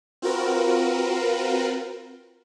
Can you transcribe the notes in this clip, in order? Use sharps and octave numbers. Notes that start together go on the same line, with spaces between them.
C4 F4 F#4 A#4 B4